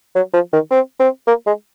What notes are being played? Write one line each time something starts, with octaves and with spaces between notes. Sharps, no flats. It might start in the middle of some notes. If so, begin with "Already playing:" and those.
F#3
F3
D#3
C4
C4
A#3
G#3